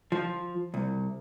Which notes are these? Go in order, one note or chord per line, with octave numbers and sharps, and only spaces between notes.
F3
C2